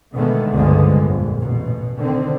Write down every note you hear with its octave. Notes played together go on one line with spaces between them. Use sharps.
B2 D3 D#3 G#3 A3 B3
C#2 G2 D3 F3 G#3 B3
A#1 F2
A1 B2
D3 D#3 C4